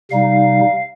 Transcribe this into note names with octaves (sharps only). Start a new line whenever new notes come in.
C3 G3 D#4 F5